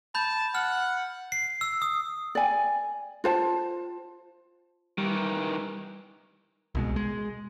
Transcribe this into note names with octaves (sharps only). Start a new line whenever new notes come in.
A5 B5 G6
F#5 F6
C7
E6
D#6
D5 G#5
F4 C5 A5
D#3 E3 G3
C2 B2 G#3
G#3